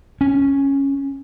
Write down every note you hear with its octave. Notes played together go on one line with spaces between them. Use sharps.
C#4